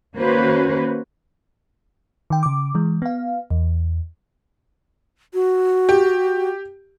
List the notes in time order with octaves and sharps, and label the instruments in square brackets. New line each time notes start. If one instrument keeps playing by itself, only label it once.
[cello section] D#3 A#3 C#4 F#4 B4 C5
[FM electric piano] D#3 G5
C#3 D6
E3 G#3
B3 F5
E2
[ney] F#4
[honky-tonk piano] G4